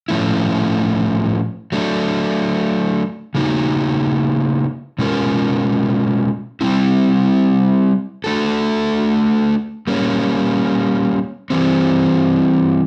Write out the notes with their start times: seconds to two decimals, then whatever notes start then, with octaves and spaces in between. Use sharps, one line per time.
0.08 A2 F3 A3 C#4 E4
1.72 F#3 A3 D4
3.34 C#3 F#3 A#3 D#4 F#4
4.99 B2 G#3 C#4 F4 A#4
6.61 G3 C4 E4
8.24 A3 D4 F#4 A4
9.87 G3 A#3 C#4
11.50 E3 G3 C4